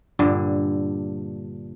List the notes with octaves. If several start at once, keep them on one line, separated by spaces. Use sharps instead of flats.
G2 A#2 D3